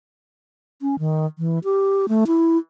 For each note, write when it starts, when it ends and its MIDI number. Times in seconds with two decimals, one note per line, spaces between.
0.81 0.96 61
0.99 1.26 51
1.39 1.59 52
1.64 2.06 67
2.09 2.24 57
2.27 2.58 64